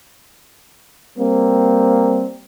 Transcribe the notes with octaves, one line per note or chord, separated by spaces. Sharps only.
G3 A#3 C4